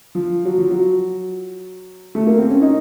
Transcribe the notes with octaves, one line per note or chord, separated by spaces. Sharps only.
F3
F#3
F3
F#3
A3
A#3
C4
C#4
D#4